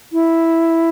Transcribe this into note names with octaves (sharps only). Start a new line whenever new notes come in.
E4